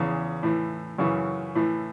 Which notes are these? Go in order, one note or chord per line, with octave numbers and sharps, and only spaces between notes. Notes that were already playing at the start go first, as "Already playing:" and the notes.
Already playing: E2 C#3 E3
A2 E3
F#2 C#3 E3
A2 E3